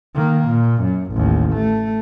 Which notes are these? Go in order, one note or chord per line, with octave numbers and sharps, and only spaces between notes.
D#3 A#3
A#2
F#2
A1 D#2
A3